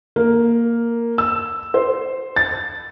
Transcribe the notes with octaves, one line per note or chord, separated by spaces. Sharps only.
A#3
E6
C5
A6